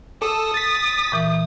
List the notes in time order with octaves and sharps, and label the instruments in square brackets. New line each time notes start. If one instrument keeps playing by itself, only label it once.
[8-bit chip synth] A4 [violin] D#6
[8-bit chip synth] A6 B6
[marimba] A#2 E3